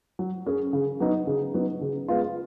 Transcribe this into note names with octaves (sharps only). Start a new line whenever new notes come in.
F#3
C#4 G#4
C#3
F#3 B3 D#4
C#3
F#3 B3 D#4
C#3
G#3 B3 F4